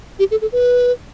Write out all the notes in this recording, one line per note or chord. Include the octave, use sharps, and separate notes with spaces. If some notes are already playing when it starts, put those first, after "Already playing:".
G4
A4
A4
B4